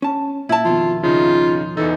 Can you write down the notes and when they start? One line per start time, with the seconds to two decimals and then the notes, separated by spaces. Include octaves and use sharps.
0.02 C#4 A5
0.49 A#2 E4 A5
0.65 F2 B2 D#3 F4
1.03 C#3 D#4 F4
1.77 E2 E3 D#4 A4